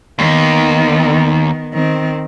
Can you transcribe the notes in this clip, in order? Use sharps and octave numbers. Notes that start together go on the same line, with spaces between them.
D#2 D#3 B3
D#3 C4